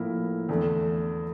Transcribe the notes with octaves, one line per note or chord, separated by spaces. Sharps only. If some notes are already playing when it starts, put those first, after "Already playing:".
Already playing: A2 F3 A#3 E4 A#4
E2 D3 A3